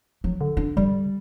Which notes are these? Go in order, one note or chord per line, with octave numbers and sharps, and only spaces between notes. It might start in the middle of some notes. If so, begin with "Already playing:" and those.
F#3
D3
D4
D3 G3